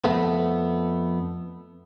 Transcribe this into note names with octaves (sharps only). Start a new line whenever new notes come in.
F2 A3 B3